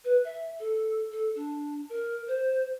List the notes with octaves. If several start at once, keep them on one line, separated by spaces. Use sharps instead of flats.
B4
E5
A4
A4
D4
A#4
C5